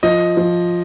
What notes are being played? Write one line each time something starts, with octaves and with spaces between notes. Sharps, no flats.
F3 D#5
F3